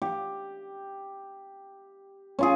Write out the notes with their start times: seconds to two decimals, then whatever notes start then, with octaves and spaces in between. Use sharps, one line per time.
0.02 G4
2.39 C#4 F4 G#4